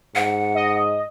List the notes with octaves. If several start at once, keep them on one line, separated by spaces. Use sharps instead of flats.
G#2 F#5
D#5